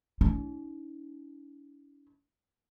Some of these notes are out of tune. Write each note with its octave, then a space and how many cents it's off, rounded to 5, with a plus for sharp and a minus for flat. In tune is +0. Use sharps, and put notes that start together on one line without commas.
C#4 +40 E4 -40